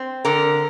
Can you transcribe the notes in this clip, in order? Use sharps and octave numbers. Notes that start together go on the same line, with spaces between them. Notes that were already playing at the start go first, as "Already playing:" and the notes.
Already playing: C4
D3 A#4